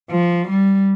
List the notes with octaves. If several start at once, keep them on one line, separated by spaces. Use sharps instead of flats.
F3
G3